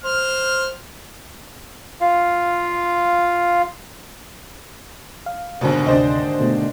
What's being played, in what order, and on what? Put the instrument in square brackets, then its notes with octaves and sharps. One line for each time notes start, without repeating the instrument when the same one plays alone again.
[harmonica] C5 F6
[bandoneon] F4 F5
[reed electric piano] F5
[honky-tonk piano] F#1 B2 [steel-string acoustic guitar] D#2 G#2 D3
[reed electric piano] D2 C3 D5 [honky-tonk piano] D4 C5 D#5
[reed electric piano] B2 A3